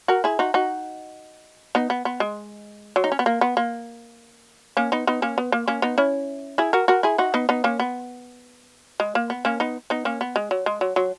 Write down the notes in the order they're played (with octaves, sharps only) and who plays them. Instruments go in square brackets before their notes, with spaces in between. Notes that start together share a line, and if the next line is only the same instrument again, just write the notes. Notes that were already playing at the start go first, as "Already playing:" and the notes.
[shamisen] F#4 A#4
E4 G#4
D#4 F#4
D#4 F#4
B3 D#4
B3
B3
G#3
F#3
D#4
C#4
B3
A#3
B3
A#3
A#3 C#4
B3 D#4
B3 D#4
A#3 C#4
B3
A#3
A#3 C#4
B3 D#4
C#4 E4
E4 G#4
F#4 A#4
F#4 A#4
E4 G#4
D#4 F#4
B3 D#4
B3 D#4
A#3 C#4
B3
G#3
A#3
B3
A#3 C#4
B3 D#4
B3 D#4
A#3 C#4
B3
G#3
F#3
G#3
F#3
F#3